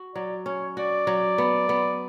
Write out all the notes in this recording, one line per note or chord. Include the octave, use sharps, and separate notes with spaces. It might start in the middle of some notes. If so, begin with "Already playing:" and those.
Already playing: F#4
F#3 D5
C#4 C#5
F#4 D5
F#3
B3
B3